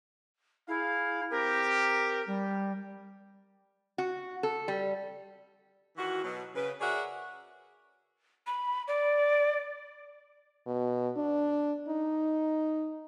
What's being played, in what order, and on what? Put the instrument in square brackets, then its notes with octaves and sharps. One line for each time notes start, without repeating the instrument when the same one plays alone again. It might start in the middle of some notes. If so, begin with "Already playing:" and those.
[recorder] E4 [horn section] G#4 F5
[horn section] C4 G4 [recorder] A#4
[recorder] G3
[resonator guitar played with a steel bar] F#4
A4
G3
[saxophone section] D#3 E3 F4 F#4
B2 F#3
C#3 B4
F#4 G#4 A#4 C#5 D5 E5
[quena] B5
D5
[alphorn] B2
D4
D#4